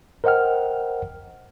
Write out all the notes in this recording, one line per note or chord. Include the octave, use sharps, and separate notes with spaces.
A#4 C5 D#5 F#5 G5 F6